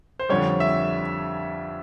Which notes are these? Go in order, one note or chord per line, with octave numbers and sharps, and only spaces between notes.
C5
F2 D3 G3 C#5
E5